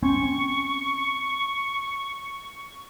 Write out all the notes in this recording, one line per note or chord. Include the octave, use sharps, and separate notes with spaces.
C4 C#4 C#6